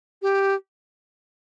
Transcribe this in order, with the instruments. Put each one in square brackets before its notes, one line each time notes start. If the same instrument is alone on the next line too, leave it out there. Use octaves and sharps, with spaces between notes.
[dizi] G4